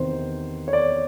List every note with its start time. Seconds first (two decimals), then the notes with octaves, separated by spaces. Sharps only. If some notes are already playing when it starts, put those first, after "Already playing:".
Already playing: E2 C3 D#3 C5
0.68 C#5
0.73 D5